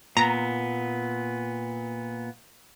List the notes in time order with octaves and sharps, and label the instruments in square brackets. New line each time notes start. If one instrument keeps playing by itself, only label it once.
[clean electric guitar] A#2 B3 [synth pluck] A#5